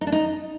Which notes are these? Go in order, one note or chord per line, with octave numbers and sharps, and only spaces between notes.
D#4
D4
D#4